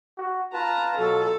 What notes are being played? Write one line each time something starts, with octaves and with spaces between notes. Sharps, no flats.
F#4
F4 B4 A5 A#5
B2 F#3 A4